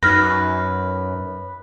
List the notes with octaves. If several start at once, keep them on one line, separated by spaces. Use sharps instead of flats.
F#2 D#4 B4 F6 A#6